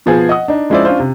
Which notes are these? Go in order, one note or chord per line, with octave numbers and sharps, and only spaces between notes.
B2 F3 B3 G#4 B4
D#5 F#5 D#6
D4 D#4
F3 G#3 C#4 E4 C5 D5
C#4 D4 F4 C5
C3